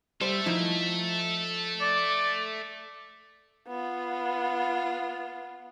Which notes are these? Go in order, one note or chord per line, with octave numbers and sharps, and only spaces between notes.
G3 A4 C5 E5
F3 D#4 E4
D5
B3 F4